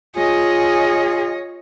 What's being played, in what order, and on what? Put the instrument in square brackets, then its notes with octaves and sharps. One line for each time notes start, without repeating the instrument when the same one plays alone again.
[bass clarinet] F4 [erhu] G#4 [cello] C#5 D#5